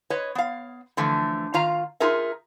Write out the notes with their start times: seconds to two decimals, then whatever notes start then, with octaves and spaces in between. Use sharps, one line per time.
0.10 B4 C#5 D#5
0.35 B3 F5
0.97 D3 E3 F3 A3
1.54 D#3 F4 F5 A#5
2.00 D#4 F4 G#4 A#4 E5